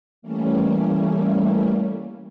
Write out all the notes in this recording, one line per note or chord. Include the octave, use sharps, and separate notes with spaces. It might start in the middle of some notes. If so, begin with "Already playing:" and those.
E3 G3 A3 A#3 C#4